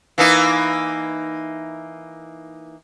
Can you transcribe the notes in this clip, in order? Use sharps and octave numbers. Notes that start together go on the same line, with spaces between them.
E3 A#3 D#4